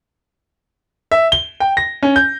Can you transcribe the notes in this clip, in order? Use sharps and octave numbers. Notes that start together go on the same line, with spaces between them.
E5
G7
G5
A#6
C#4
G6